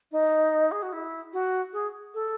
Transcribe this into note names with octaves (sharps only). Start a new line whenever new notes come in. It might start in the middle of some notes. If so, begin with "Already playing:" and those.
D#4
G#4
F#4
E4
F#4
G#4
A4